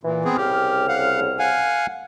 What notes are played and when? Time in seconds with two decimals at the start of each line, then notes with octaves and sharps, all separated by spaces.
0.03 A#2 E3
0.25 B3 C4 G#4
0.37 C2 C#3 G4 F6
0.89 F5 F#5
1.39 F5 F#5 G#5